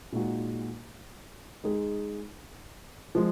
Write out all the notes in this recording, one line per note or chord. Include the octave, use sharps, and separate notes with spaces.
A#2 G#3 D#4 F#4
G#3 D#4 G#4
F3 G#3